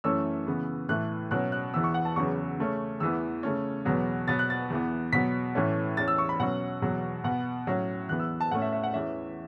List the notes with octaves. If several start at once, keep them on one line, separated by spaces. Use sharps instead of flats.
F#2 E3 A3 C#4 E6
C#3 E3 B3
A2 E3 A3 F#6
B2 F#3 C#4 F#6
F#6
E2 E3 B3 E6
C#6
F#5
A5
E2 C#3 F#3 B3 C#6
C#3 A3 C#4
E2 E3 B3 E6
C#3 A3 C#4
E2 B2 F#3 B3
B2 F#3 B3 A6
F#6
A6
E2 E3 B3
B2 F#3 B3 B6
A2 E3 A3 C#4
E2 E3 C#4 A6
E6
C#6
B5
B2 F#3 C#4 F#5
E2 B2 F#3
B2 B3 F#5
A2 F#3 C#4
E2 E3 B3 F#6
E6
A5
A2 A3 C#4 F#5
E5
E5
F#5
E2 E3 C#4 E5